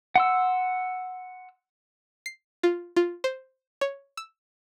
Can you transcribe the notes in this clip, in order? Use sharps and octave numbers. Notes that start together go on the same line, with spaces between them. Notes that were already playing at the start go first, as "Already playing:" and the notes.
F#5 C6 E6
C7
F4
F4
C5
C#5
E6